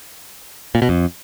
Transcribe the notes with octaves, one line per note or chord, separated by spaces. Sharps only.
A#2
B2
F2